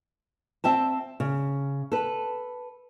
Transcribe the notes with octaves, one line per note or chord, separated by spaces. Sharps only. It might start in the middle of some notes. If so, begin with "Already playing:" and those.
C4 E5 G5 A5
C#3
A4 B4